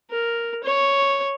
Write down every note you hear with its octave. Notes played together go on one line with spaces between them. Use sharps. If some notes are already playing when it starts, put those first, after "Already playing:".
A#4
C#5